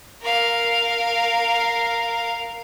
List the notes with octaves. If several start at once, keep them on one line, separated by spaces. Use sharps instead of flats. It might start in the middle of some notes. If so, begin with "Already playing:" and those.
A#4 F5